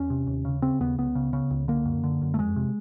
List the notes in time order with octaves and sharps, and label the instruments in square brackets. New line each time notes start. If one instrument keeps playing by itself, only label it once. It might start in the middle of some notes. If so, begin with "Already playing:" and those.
Already playing: [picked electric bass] E2 C#4
C3
D#2
C#3
C#3 C4
D#2 B3
C#2 B3
C#3
C#3
C#2
D3 A#3
F#2
D3
F#2
A3
F2 G#3
C3